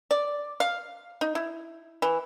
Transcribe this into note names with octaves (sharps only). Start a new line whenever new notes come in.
D5
F5
D#4
E4
E3